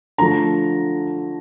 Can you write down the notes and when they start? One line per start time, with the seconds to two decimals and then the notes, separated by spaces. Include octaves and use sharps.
0.18 D3 F3 A3 A#5